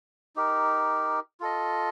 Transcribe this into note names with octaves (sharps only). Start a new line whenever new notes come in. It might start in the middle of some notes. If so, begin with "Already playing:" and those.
D#4 G4 A#4
F4 A4 D#5